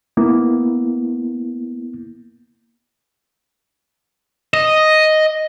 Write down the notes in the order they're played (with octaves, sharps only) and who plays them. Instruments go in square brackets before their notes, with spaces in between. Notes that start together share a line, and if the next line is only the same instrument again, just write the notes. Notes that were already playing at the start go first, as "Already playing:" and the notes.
[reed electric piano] A#3 B3 E4
[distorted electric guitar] D#5